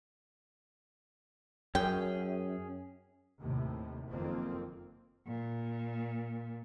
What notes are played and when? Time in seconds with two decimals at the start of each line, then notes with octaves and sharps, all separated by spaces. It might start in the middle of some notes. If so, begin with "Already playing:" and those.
1.75 F#2 C#4 G#4 G5
3.40 D#2 A2 C3
4.09 F#1 F2 D#3 A#3 C4
5.27 A#2